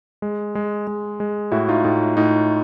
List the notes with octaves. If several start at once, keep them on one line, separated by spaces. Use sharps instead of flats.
G#3
G#3
G#3
G#3
A2 E4 F#4
D#4 F4
A2 D#4
A2 D#4